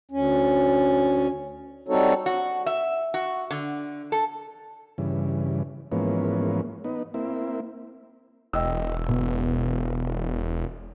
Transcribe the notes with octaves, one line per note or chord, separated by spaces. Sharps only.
D2 C#4
G3 C4 D#4 F#4 A4 C#5
F#4
E5
F#4
D3
A4
G2 C#3 E3
G#2 E3 F3 A#3 B3 C#4
B3 D#4
A#3 C4 E4
E1 D#5 G5 E6
B2